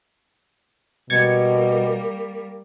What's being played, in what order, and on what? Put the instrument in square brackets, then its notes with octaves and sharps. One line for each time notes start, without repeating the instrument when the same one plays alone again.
[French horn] B2 [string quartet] G3 A#3 [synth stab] G#6 A6 C#7